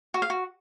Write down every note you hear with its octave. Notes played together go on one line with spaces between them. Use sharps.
F#4
F5
F#4